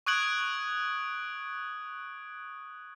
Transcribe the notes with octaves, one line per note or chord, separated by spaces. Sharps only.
C#6 D#6 F#6 G#6 D7 F#7